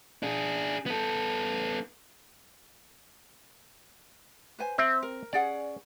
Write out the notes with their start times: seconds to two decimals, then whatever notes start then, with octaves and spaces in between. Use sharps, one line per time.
0.23 D4 G#4
0.86 B3 A4
4.59 B4 C5 G#5
4.78 C4 C5 E5
5.03 A#4
5.33 C#4 G#4 D5 F#5